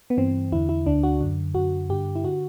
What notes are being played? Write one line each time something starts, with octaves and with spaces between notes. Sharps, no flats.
B3
G2 E3 C4
E2 D3 E4
E4
D2 D3 D4
F#4
F#2 D3
F#2 D3 F#4
G2 D3 G4
E4
D3 F#4